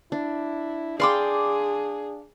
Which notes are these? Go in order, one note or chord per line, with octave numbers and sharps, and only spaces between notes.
D4 E4
D4 G#4 D5 F5 G5 C6 D6